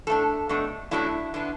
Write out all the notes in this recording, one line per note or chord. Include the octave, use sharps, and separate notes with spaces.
A2 A3 D4 A4
B2 A3 D4
F#2 F#3 A3 D4 E4
D3 B3 D4